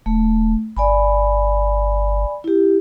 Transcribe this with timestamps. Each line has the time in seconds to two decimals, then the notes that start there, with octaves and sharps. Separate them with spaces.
0.06 D#1 A3
0.77 G1 D5 G#5 B5
2.44 E4 G4